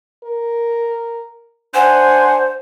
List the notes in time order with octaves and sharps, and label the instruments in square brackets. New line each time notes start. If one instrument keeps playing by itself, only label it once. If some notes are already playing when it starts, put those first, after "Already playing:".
[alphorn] A#4
[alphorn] D4 [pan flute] C5 [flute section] F#5 G#5 C6